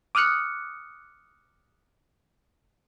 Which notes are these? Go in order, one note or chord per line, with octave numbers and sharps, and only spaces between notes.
D6 D#6 F6 F#6 C#7